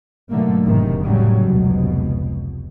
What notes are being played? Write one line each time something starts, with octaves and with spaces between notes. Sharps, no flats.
G#2 B2 D3 F#3 A3 A#3
F1 G#2 C3 D#3
A2 C#3 F#3 G3
F1 C#2 B2